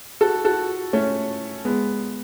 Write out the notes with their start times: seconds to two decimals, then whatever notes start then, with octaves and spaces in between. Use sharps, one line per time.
0.21 F#4 A4
0.45 F#4 A4
0.93 A3 C#4
1.65 G#3 B3